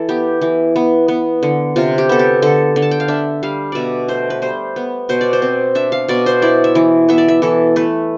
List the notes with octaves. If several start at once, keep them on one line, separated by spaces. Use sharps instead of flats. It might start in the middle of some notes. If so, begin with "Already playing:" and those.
Already playing: E3 A4
B3 G4
E3
B3
B3
D3
C3 F4
G4
B3 A4
G4
D3 A4
D3
A5
G5
F5
D4 E5
G3 F5
B2 D5 E5
A3 C5
B4
G3 C5
B3
B2 C5
D5
C5
C4
D4 E5
F5
B2 D5
C5
E4 D5
E5
E3
B3 E5
D5
E5
E3 A4
A3 B4